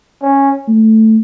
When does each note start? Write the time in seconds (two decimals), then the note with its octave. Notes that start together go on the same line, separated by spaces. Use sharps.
0.22 C#4
0.68 A3